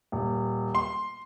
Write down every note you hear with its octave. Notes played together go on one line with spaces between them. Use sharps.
D#1
C6